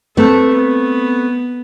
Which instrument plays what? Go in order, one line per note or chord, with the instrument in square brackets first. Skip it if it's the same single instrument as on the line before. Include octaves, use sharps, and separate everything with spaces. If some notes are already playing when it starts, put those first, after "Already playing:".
[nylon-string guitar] A3 C4 B4 [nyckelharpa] A4
[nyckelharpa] B3